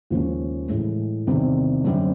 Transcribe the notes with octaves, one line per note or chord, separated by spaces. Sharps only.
D#2 C#3 F3 G#3 C#4
A2 E3 G#3
E2 C3 D#3 G3
F#2 D3 G3 C4